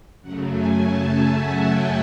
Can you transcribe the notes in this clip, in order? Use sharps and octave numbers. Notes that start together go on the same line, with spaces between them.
F#2 C#3 F#3 A3 F#5
G#5
A5
E5
F#5
G5